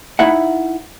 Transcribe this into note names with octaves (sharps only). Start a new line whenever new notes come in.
D#4 E4 E5 F#5